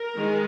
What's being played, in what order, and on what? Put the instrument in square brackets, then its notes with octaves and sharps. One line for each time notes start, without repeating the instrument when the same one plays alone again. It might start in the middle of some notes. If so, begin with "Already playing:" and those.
Already playing: [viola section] A#4
D#3 G#3